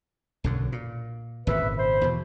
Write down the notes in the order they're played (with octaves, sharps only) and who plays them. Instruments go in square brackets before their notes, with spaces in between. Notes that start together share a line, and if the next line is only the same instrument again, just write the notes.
[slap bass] B1 F#2 D3
A#2
[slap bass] G#1 A#2 C#3 [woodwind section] B4 E5
[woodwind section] C5 B5
[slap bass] E2 B2